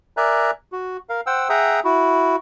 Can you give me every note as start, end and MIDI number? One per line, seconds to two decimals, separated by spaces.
0.17 0.51 70
0.17 0.51 74
0.17 0.51 76
0.17 0.51 80
0.17 0.51 82
0.17 0.51 90
0.72 0.97 66
1.09 1.21 70
1.09 1.21 77
1.26 1.49 72
1.26 1.49 78
1.26 1.49 79
1.26 1.49 88
1.49 1.80 68
1.49 1.80 76
1.49 1.80 78
1.49 1.80 79
1.49 1.80 82
1.49 1.80 87
1.84 2.36 64
1.84 2.36 66